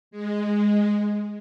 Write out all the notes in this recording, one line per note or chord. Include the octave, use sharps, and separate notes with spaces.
G#3